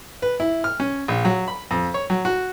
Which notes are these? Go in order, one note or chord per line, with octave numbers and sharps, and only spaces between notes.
B4
E4
F6
C#4
A#1
F#3
B5
F2
C#5
F#3
F#4